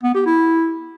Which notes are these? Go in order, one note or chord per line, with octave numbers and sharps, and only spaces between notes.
B3
G4
E4